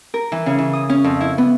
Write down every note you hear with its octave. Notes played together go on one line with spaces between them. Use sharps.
A#4
E3
C#3
E3
D#6
C#4
F2
E4
B3